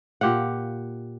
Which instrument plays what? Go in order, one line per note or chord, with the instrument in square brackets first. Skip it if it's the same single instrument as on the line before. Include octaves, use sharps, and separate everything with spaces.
[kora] A#2 G4 F5 F#5